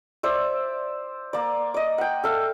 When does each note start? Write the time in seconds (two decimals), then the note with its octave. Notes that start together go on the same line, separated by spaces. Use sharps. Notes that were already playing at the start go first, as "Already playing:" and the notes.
0.23 C5 D5 E5
1.33 A#3 D5
1.74 D5 D#5
1.98 F#5 G5
2.24 A4 E5 F5